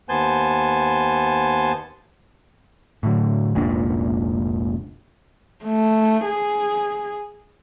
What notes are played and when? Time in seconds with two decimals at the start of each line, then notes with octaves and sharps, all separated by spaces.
0.09 D#2 B3 C5 G#5 A5 G6
3.03 A2 D3 F#3
3.55 F1 C#2 A#2 D4
5.64 A3
6.26 G#4